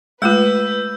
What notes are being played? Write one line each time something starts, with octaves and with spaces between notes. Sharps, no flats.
G#3 A3 F4 B4 E6 G6